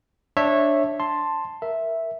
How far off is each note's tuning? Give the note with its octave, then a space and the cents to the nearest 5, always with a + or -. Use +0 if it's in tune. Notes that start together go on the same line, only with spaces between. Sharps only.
D4 +0 C#5 -15 E5 +0
A5 +5 C6 +5
A#4 +0 E5 +0